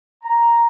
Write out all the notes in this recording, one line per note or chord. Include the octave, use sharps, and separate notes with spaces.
A#5